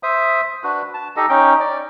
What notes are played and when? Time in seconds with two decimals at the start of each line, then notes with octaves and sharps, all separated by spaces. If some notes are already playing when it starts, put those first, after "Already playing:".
0.03 C5 E5 D#6
0.64 D4 F#4 B4
0.94 A5
1.16 D#4 G4 A4 D#5
1.29 C#4 D#4 G5
1.60 D5